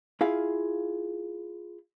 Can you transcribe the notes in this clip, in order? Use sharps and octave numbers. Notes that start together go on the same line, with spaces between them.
E4 F4 G#4 F5